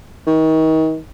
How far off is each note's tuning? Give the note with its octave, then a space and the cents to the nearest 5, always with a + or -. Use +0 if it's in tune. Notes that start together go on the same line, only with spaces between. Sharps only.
D#3 +35